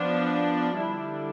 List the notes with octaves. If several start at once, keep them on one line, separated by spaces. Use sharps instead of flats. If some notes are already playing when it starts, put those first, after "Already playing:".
Already playing: F3 B3 D4
D3 G3 D4 E4